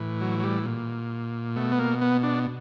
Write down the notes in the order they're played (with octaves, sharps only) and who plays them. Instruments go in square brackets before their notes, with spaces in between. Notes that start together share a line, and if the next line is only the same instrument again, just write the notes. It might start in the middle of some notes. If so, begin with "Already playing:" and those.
Already playing: [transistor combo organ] A2 E3
F#3
F#3
G3
A#2
B2 A3
B3
A#3
B3
D4